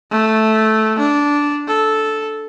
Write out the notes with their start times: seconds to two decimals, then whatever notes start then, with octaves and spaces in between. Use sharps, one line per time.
0.11 A3
0.99 D4
1.68 A4